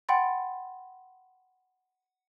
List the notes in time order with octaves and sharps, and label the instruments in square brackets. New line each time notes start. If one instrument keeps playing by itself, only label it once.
[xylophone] F#5 G5 B5 C6 A6